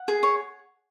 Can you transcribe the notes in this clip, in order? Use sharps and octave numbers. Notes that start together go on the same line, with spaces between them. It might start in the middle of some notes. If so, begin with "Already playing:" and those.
Already playing: F#5
G#4
C#5